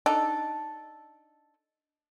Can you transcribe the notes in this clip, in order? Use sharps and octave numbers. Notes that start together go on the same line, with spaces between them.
D4 D#4 A4